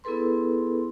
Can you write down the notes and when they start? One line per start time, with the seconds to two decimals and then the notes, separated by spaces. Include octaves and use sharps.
0.04 B3 E4 G#4 A4 B4 C6